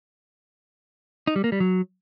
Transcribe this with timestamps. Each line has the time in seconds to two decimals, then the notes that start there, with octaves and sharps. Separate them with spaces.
1.27 D#4
1.36 G3
1.44 A#3
1.52 G3
1.60 F#3